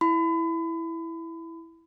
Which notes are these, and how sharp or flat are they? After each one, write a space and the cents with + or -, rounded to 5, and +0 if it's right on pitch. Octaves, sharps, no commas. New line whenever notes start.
E4 +0 B5 +35